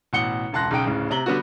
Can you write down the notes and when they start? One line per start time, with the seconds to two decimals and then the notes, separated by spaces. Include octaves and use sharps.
0.13 A1 B2 F#5 C#7 G7
0.52 E1 C#2 A5 C6 F#6 A#6
0.71 B1 C#3 D#4 G5 D7
0.85 D1 C#3
1.11 C3 A#5 F#7 G7
1.26 D3 G3 B3 D4 F#4